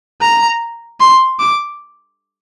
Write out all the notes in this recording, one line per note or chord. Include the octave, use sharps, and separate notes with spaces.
A#5
C6
D6